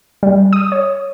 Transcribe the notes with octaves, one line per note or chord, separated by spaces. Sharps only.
G3
D#6
C#5